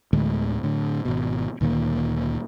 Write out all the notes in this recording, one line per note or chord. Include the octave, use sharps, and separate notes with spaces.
D2 A2 D3 G#3
A2 D3
G#1 B2
D2 A#2 D#3 A#3